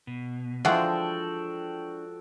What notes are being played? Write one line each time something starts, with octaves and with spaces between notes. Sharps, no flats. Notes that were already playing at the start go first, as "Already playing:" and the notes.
B2
E3 F3 G#3 D4 F#4 A4 F#5 G5